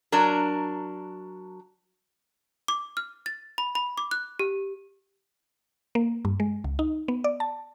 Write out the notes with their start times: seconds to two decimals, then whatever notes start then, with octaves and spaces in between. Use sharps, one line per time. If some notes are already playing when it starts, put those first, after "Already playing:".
0.12 F#3 D4 A#4
2.68 D6
2.97 F6
3.26 A6
3.58 B5
3.75 B5
3.97 D6
4.11 F#6
4.39 G4
5.95 A#3
6.25 G2
6.40 G#3
6.64 C#2
6.79 D#4
7.08 B3
7.24 D5
7.40 A5